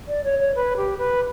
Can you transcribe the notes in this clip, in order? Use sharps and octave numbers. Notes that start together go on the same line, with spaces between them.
D5
C#5
C#5
B4
G4
B4